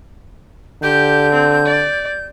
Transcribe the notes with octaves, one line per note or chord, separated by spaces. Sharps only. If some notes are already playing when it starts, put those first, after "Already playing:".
D3 G4 G6
C4
D5